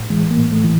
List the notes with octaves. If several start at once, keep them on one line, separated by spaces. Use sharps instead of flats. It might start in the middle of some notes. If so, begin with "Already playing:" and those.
Already playing: A2
E3 G#3
A#3
A2
A3
E3